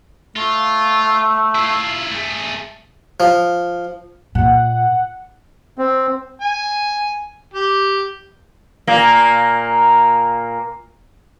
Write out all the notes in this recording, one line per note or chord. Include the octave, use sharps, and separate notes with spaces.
A3 F4
E4 F4
A3 G#4
F3
A#2 F#5
C4
G#5
G4
A#2 A#3